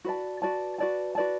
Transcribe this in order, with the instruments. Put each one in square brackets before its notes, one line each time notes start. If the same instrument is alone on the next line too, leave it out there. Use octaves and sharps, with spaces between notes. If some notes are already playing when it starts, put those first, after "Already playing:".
[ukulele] F#4 B4 D5 A5
F#4 B4 D5 A5
F#4 B4 D5 A5
F#4 B4 D5 A5